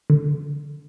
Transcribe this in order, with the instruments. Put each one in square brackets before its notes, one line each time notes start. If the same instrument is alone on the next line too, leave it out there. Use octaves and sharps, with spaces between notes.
[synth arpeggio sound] D3